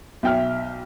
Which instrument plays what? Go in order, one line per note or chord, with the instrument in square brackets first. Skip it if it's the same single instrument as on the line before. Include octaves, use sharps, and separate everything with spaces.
[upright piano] B1 G5 F6 [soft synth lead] E5